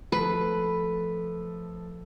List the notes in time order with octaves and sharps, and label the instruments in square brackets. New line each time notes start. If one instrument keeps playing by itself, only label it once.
[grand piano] F3 A3 A4 [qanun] B4